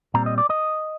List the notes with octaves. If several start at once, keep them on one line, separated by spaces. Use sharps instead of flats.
A#2 G3 C4 A#5
D#5
D5
D#5